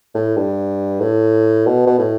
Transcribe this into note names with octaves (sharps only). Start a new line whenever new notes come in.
A2
G2
A2
B2
B2
A2